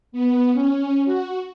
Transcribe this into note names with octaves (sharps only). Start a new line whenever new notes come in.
B3
C#4
F#4